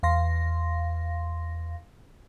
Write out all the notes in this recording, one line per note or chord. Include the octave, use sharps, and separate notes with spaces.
E2 F5 C6 A#6